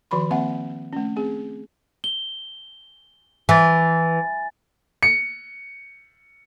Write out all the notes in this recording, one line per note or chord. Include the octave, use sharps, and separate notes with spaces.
D#3 F3 F#4 B5 C6
A#3 C4 E5 F#5
A3 C#4
C4 G#4
G7
E3 G#5 A6
C#7